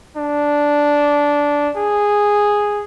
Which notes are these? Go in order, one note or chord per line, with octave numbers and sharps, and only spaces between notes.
D4
G#4